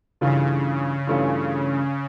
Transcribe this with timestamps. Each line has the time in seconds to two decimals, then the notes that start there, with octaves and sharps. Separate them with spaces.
0.21 G2 C#3 E3 A3 C#4 F4
1.07 G2 E3 A3 C#4 F4